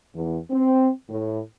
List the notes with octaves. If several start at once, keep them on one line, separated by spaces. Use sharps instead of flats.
E2
C4
A2